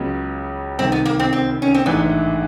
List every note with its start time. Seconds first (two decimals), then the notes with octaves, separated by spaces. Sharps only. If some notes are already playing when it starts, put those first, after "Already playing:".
Already playing: C#2 C#3 F#3 B3
0.79 C2 C3 D#3 C4
0.92 B3
1.05 A#3
1.19 C4
1.33 C4
1.62 C#4
1.75 C4
1.86 A1 G#2 E3 A3 B3 D4